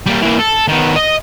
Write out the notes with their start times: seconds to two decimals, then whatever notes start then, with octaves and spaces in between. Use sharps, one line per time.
0.06 G3 A#3
0.22 E3 A#3
0.39 A4
0.68 D#3 B3
0.96 D#5